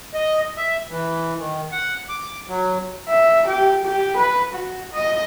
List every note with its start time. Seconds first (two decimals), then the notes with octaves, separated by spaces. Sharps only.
0.14 D#5
0.57 E5
0.90 E3
1.38 D#3
1.72 F#5
2.09 D6
2.48 F#3
3.08 E5
3.47 G4
3.84 G4
4.16 B4
4.53 F#4
4.93 D#5